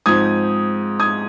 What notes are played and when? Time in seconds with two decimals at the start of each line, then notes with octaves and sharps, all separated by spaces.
0.06 G#2 F3 C4 D#6 G#6
1.00 D#6 G#6